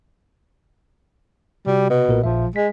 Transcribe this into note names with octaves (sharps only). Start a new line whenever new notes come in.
C3 G3 F#4
B2
B1 A#2 A#4
A#1 A#2 F3 E5
G#3 B6